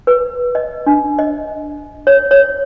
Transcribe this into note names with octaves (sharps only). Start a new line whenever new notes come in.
B4
D#5
D4
D#5
C#5
C#5